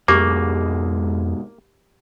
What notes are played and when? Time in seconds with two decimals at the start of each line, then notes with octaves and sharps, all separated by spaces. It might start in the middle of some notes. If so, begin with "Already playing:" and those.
0.08 F2 G#2 B2 G#3 A#3 G4 D6